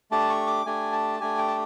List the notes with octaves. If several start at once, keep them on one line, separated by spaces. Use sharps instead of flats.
A3 D4 G4 A5
C#6
D6
A3 D4 G4 G#5
A5
A3 D4 G4 G#5
G5
A5